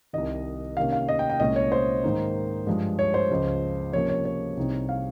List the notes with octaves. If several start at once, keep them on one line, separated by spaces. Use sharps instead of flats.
C2 C3 D#3 D#5
C3 D#3 A#3 C#4 F5
F5
D#5
G5
G5
C2 A#2 G#3 C#4 D#5
C#5
C5
G#2 D#3 A#3 D#4
G2 F3 G#3
C#5
C5
C#2 C#3 F3
C3 F3 A#3 C#4 C#5
C#5
C#5
C2 C3 G3 C4 D#4
F5